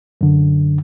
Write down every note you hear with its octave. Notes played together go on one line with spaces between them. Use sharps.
F#2 D3